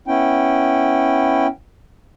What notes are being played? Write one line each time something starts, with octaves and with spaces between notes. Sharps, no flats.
B3 C#4 E4 G5